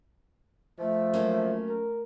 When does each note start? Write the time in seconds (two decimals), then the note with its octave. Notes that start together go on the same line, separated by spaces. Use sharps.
0.79 F3 A3 E5
1.13 F#3 A#3 C#4
1.69 A#4